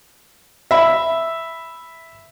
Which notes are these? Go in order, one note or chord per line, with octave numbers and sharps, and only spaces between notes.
E5 B5